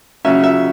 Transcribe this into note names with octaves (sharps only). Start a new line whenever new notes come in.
C#3 F#3 C#4 E5
E5